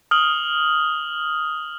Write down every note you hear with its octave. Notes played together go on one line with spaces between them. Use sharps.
D#6 F6 F#7 G7